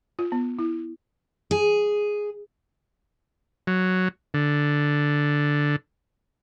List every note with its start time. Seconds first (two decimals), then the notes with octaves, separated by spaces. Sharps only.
0.19 F4
0.32 B3
0.59 E4
1.51 G#4
3.67 F#3
4.34 D3